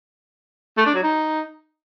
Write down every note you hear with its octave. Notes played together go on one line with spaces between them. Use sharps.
A3
D4
F#3
D#4